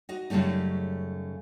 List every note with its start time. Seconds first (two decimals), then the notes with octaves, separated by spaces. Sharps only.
0.09 D#4 F#4 D#5
0.30 F#2 C#3 G3 A3 D#4